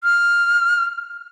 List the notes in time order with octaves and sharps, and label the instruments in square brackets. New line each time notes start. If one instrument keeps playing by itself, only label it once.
[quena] F6